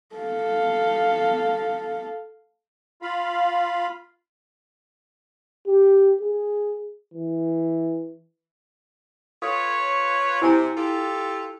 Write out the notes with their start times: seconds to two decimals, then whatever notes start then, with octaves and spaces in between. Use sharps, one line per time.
0.16 A4 F5
3.02 F4 F5 B5
5.67 G4
6.21 G#4
7.14 E3
9.42 F4 A4 B4 C#5 F5 C#6
10.41 C3 E4 G#5 A#5
10.76 F4 G4 A4